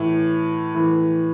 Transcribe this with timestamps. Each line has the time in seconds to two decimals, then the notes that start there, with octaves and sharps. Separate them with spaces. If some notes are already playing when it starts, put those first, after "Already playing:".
Already playing: A2 E3
0.75 A2 E3